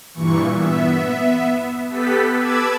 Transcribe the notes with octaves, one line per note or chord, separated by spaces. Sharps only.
G2 A#2 E3 C#6
B3 E5
B3 G4 A4 B4 B6
B4 A5 B5 D6 E6 G#6